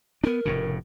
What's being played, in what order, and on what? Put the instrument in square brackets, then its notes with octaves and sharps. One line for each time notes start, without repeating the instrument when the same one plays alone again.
[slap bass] B3 D4 [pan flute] A#4
[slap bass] F1 A2 C#3